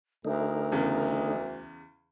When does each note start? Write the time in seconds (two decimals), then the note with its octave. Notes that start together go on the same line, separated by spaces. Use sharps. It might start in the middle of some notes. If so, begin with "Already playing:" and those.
0.25 D2 D3 A3 D#4 A#4
0.72 E2 C#3